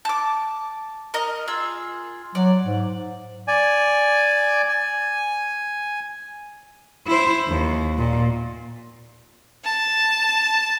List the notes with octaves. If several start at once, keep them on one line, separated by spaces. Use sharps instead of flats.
A5 D6
A#4 D#5 F5
F4 G#4 E6
F#3 D5
G#2
D5 G#5
G#5
E4 C5
D#2
A#2
A5